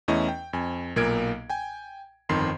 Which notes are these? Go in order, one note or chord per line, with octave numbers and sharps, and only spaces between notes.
E2 A3 C#4 E4 D#5 C#6
G5
F2 G#5
B1 A#2 A#3 A#4 G#6 D7
G5 G#5
G1 F2 D#3 C6 C7